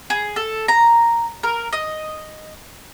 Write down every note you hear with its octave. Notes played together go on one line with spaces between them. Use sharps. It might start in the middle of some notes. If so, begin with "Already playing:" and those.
G#4
A4
A#5
A#4
D#5